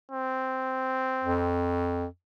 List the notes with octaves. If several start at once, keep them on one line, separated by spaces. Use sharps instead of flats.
C4
F2